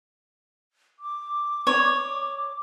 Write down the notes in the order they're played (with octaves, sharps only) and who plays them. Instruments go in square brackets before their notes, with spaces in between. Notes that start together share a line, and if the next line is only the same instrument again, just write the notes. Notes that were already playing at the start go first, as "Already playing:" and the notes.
[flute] D6
[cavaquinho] C#5